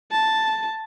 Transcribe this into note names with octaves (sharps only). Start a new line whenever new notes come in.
A5